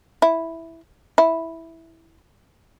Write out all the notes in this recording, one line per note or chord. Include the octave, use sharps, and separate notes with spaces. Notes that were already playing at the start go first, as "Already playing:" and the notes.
E4
E4